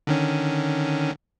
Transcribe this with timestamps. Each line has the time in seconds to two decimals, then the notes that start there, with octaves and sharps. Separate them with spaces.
0.07 D3 D#3 C#4